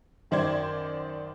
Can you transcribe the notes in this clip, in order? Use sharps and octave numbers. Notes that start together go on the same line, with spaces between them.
F#2 D#3 C5 D5 G#6